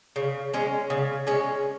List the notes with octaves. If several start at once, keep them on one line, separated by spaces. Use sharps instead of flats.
C#3
G#3 C#4
C#3
G#3 C#4